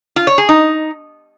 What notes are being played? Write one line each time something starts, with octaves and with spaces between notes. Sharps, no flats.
F4
C#5
G#4
D#4